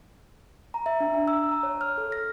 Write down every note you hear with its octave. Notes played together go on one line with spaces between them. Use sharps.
A#5
E5
D4
A#5
E6
A#5
C#5
F6
A4
A#6